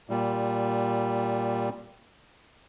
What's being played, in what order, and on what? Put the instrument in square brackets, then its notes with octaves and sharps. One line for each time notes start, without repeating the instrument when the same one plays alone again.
[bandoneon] A#2 G3